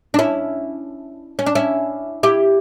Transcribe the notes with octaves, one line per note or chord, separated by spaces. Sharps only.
D4
C#4 E4
C#4
D4
C#4 E4
E4 G4